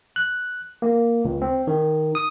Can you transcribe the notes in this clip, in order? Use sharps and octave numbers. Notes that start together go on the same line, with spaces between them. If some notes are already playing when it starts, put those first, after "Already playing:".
F#6
A#3
C#2
C4
D#3
D#6